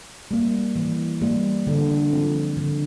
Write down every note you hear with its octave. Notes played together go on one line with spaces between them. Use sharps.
G3 A#3
E3
G3 A#3
D3
F3 C4
D3